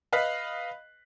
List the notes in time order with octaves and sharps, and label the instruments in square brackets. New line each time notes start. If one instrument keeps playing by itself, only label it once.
[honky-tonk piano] B4 D#5 F5 B5 F#6 B6